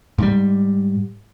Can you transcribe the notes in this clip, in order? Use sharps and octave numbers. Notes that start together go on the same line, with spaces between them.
G#2 G3